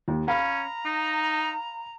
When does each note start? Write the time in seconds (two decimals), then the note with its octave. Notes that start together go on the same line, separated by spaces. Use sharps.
0.08 D#2
0.28 C#4 F5 A#5 B5
0.85 D#4